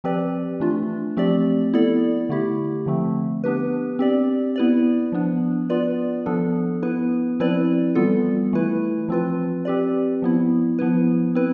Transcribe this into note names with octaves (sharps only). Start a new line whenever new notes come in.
F3 C4 G4 B4 D5
E3 A3 D4 F4
F3 A3 C4 G4 D5
B3 E4 A4 D5
D3 A3 E4 G4
D3 F3 A3 C4
B3 D4 G4 B4
C4 G4 D5
B3 E4 B4 D5
F3 B3 D4
B3 F4 B4 D5
F3 B3 D4 A4
B3 E4 B4
F3 C4 E4 B4 D5
E3 G3 B3 F4 A4
E3 A3 E4 B4
F3 C4 F4 B4
C4 G4 B4 D5
F3 B3 E4
F3 B3 E4 B4
C4 E4 B4